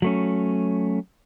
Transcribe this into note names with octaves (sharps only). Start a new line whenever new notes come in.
F#3 A3 C#4